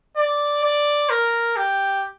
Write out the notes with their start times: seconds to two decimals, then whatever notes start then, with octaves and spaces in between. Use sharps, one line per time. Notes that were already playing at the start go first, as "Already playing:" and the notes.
0.17 D5
0.63 D5
1.10 A#4
1.56 G4